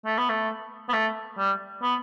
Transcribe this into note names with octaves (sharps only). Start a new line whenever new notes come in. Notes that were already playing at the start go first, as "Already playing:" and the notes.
A3
B3
A3
B3
A3
G3
B3